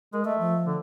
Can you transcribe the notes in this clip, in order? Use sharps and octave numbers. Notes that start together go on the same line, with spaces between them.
G#3 A#4
A3 D#5
F3
D3